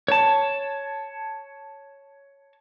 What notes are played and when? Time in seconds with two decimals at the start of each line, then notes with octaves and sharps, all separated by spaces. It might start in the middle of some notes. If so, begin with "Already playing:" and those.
0.08 C#5 A5